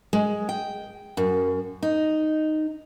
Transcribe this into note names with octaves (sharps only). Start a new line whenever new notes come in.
G#3
G5
F#2
D#4